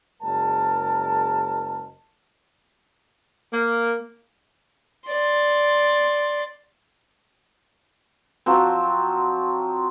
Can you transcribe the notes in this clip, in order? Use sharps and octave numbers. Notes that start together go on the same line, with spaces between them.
F#1 G#3 A#4 A5
A#3
D5 C6
F3 F#3 C4